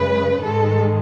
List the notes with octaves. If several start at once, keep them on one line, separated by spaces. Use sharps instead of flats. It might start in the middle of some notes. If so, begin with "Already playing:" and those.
Already playing: F#2 C#3 G#3 B4
G#2 D#3 G#3 A4